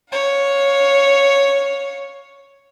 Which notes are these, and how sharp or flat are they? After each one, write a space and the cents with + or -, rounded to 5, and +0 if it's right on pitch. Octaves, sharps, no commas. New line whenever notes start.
C#5 +0 F5 +25